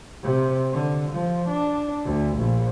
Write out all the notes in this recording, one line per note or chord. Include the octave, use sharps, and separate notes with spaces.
C3
D3
F3
D4
D2
A#1